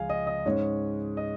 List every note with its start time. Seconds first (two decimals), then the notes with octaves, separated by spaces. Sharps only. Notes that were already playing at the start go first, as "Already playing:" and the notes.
Already playing: C#2 C#3 F3 G#3 F5 G#5
0.09 D#5
0.27 D#5
0.46 G#2 G#3 C#4 C#5
1.17 D#5